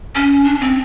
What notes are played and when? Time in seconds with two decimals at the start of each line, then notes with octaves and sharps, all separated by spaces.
0.15 C#4
0.44 D4
0.61 C4